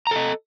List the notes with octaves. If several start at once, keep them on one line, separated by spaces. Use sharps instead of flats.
A4 D#5 A#5